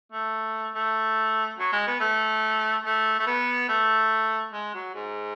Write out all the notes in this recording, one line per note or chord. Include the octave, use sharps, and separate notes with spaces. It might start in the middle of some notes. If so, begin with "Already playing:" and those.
A3
A3
F#3
G#3
B3
A3
A3
A3
B3
A3
G#3
F#3
G#2